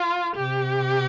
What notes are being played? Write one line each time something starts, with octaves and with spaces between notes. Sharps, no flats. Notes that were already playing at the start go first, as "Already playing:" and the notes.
Already playing: F4
C3 G4